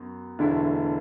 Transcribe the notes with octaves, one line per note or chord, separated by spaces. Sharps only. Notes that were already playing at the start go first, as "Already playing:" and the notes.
Already playing: F#2 B3
E1 D2 D3 A3 E4